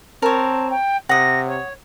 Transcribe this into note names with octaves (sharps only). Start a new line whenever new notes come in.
C4 A#4 C#5 A5
G5
C3 F#5 D#6 A#6
C#5